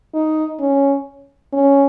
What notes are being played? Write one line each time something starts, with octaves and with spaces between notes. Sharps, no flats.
D#4
C#4
C#4